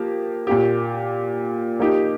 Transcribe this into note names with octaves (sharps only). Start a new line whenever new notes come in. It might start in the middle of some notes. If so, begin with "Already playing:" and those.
Already playing: F3 A#3 G4
A#2 A#3 G4
F3 A#3 D#4 G4